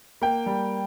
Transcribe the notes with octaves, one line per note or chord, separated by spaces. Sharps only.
A#3 G5
G3